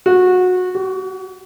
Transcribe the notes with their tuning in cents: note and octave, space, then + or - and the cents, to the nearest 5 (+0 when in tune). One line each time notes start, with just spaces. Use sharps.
F#4 -20
F#4 +35